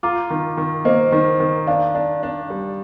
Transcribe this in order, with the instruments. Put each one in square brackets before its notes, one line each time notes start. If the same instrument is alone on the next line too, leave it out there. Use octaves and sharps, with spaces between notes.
[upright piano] F4 [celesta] A#5 D6
[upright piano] D#3
D#3
[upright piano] A#3 [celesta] C5 D#5
[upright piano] D#3
D#3
[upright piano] D4 [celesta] D5 F5
[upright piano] D4
D4
G3